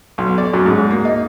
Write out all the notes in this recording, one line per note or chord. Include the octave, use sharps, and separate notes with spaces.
B1
D5
F#2
G#2
A#3
D#4